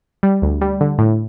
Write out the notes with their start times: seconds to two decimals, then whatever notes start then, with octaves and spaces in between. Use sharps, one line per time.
0.23 G3
0.42 D2
0.61 G3
0.81 D3
0.99 A2